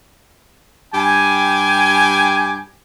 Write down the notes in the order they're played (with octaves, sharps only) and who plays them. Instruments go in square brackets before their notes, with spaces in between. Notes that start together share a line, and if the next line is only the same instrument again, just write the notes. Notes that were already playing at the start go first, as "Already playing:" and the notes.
[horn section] G2 G4 G5 G#5